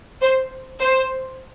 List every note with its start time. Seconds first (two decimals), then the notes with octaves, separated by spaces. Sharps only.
0.21 C5
0.81 C5